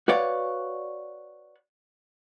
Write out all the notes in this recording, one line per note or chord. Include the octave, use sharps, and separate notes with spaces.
F#4 B4 C#5 D5 F5